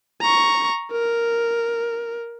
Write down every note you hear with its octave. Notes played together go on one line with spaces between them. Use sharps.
A#5 C#6
A#4